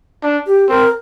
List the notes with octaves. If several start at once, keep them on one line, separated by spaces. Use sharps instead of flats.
D4
G4
C4 A#4